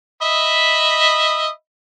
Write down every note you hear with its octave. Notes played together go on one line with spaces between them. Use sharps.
D#5 E5 B5